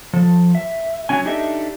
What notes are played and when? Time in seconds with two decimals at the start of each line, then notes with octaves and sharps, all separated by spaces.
0.13 F3 A4
0.55 E5
1.09 F#3 C#4 G#5
1.25 D4 D#4 G4 A4 D#5 E5